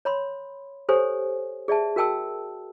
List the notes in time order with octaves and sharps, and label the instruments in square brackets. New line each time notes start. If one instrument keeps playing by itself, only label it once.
[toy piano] C#5 B5 C6
G4 A4 C5 C#5 G#5
G#4 D5 E5 A5
F#4 A#4 G5 A5 E6